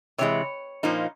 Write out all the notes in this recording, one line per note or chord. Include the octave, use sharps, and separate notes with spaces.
C3 E3 G#3 C#5
A#2 F3 A#3 D#4